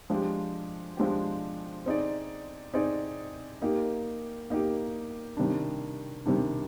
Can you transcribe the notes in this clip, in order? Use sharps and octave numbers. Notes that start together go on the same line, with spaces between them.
F3 G#3 D4 G4
F3 G#3 D4 G4
C4 D#4 G#4 D5
C4 D#4 G#4 D5
A#3 D#4 G4
A#3 D#4 G4
C3 D#3 G3 D4
C3 D#3 G3 D4